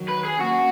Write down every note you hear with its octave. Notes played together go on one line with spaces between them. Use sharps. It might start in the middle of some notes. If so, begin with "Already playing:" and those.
Already playing: D#3 F#3
B4
G#4
A#3 C#4 F#4